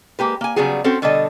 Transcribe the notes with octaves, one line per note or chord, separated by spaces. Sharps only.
G#3 A#3 G4 B4
A#3 G#5
C#3 F#3 G3 B3 F#4 G#4
C4 C#4 F#4 A4 C5
B2 D3 G3 A4 D#5